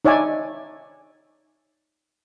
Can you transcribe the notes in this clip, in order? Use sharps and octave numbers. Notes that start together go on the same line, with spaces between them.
D#4 C#5 D5 E5 G#5